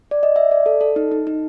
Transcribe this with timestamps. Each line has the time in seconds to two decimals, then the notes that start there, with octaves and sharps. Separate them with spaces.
0.11 D5
0.23 D#5
0.36 E5
0.51 D5
0.66 A4
0.81 A4
0.96 D#4
1.11 D#4
1.27 D#4